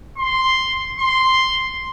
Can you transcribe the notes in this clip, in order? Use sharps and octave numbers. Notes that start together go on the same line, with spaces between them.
C6
C6